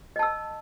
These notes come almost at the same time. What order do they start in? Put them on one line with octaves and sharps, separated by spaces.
D#5 A5 E6